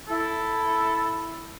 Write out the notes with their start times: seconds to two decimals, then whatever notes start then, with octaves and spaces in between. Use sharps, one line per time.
0.09 E4 A4